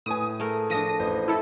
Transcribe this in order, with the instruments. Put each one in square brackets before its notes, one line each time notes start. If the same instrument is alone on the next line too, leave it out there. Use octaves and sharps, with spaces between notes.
[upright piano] A2 B4 G#5 [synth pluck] D#6
[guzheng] A3 G#4 A#4
[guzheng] F3 D4 [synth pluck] D#6 A#6 D#7
[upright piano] A1 C5
[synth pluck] E4 A4